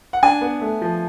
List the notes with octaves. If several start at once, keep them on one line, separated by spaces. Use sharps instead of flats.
F#5
D4 G#5
B3
A3
F3